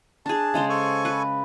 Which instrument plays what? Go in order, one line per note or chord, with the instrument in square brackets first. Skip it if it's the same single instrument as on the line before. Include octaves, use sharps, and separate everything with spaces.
[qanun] D4 G#4 [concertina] A5
[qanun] C#3 G#3 C5
[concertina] A4 G#5 C#6
[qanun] B4